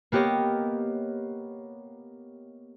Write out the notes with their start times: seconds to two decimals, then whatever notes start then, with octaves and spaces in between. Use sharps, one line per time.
0.12 A#3 B3 G4 C#5 D#5